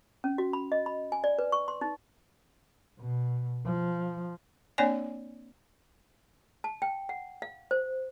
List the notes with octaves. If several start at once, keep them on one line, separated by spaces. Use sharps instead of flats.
C#4
F#4
B5
D#5
B5
G#5
D5
B4
C#6
C6
D#4
B2
F3
A#3 C4 D4 C#5 D5 G#5
A5
G5
F#5
F5
C5